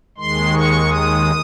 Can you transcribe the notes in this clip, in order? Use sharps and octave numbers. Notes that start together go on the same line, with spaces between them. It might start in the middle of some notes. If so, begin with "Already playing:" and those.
D#2 D#3 G#3 C6
C#6
D#6